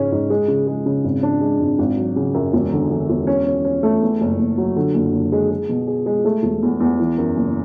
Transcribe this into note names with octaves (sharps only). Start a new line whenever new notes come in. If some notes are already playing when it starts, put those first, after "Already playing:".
Already playing: G#2 C#3 G#3 C#4
G#2
G#3
C#3
G#3
C#3
G#1
D4
G#3
G#1
G#1
F#3
C#3
F#2
E1
D3
D3
E1
C#4
C#4
C#4
A3
E2
F#1
F#1
F#3
D3
F#1
F#1
G#3
G#4
B2
G#4
G#3
A3
E1
E2
E2
E3
F#2
F#1